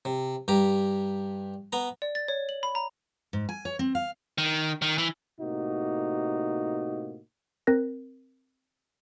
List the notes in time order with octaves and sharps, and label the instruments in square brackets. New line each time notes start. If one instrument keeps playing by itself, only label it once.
[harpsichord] C3
G2 G4 A#5
B3 A#5
[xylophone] D5
A6
C#5
F#7
B5
A#5
[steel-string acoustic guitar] G#2
G#5
C#5
C4
F5
[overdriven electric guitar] D#3
D#3
E3
[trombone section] A2 C3 A#3 D#4 F#4
[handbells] C4 A#4 F#6 A#6